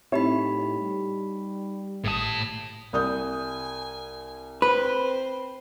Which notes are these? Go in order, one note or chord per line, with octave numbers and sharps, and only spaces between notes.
A2 C4 D#4 E4 G4 C#5 B5
G3
G#1 A2 A5 D#6
C2 G#5 D#6 G6
C4 B4 C5